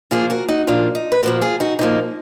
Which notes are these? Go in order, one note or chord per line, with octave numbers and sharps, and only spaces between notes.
A#2 F3 A#3 F4 G#4
F#4 A#4
D#4 F#4
A#2 F3 A#3 D4 F4
D#4
B4
A#2 F3 A#3 F#4 A#4
F4 G#4
D#4 F#4
A#2 F3 A#3 D#4